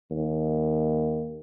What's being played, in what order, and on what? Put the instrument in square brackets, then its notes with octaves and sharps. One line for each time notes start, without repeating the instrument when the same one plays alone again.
[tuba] D#2